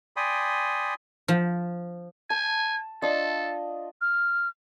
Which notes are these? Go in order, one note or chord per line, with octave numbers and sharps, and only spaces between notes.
D5 G5 G#5 B5 C6 D#6
F3
G#5 A5
D4 F4 A4 D#5
F6